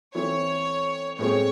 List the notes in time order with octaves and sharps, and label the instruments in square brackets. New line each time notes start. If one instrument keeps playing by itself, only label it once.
[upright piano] E3 C4 E4 A4 [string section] C#5
[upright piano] A2 G#3 C4 [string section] C#5